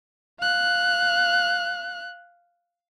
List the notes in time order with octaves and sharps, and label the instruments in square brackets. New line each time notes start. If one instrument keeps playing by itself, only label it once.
[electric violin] F5 F#6